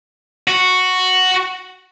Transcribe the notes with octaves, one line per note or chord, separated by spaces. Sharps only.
F#4